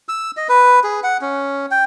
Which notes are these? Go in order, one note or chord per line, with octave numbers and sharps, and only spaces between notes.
E6
D#5
B4
G#4
F#5
C#4
G5